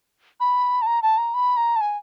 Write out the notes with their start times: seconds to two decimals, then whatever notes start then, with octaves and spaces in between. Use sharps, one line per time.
0.40 B5
0.82 A5
0.87 A#5
1.02 A5
1.18 A#5
1.34 B5
1.57 A#5
1.76 A5
1.81 G#5